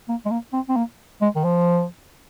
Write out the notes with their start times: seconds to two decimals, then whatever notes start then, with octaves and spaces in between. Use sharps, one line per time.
0.09 A#3
0.26 G#3
0.31 A#3
0.53 C4
0.69 C4
0.76 A#3
1.22 G#3
1.36 D#3
1.44 F3